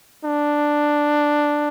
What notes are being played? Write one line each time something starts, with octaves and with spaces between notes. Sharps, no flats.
D4